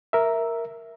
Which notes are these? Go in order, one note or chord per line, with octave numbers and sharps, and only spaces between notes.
A#4 E5